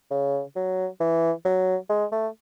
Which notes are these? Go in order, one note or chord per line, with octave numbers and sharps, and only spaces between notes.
C#3
F#3
E3
F#3
G#3
A3